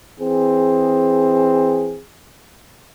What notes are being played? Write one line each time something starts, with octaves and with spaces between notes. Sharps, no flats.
E3 C4 G#4